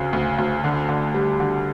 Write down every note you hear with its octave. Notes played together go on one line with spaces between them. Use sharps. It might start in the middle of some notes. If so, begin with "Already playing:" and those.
Already playing: D2 C#3
D2
D2
D3
D3
G3
D3